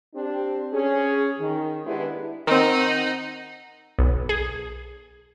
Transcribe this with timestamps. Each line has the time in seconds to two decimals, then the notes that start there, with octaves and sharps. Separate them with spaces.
0.15 C4 D4 G4
0.72 C#4 G#4
1.39 D#3
1.85 G#3 B3 D4 E4 G4
2.47 D#3 C4 D#4 F#5
3.99 B1
4.29 G#4